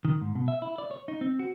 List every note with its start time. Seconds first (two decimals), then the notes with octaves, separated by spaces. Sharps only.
0.05 D#3
0.21 G#2
0.35 B2
0.48 E5
0.62 E4
0.78 D5
0.91 C#5
1.08 D#4
1.21 C4
1.39 F#4